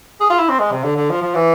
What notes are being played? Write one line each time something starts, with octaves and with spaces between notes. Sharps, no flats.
G#4
F4
E4
C4
G#3
C3
D3
D3
F3
F3
E3